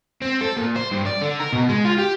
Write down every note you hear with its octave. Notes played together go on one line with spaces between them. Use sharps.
C4
A4
A#2
C5
G2
D5
D3
A#4
B2
G#3
F4
G4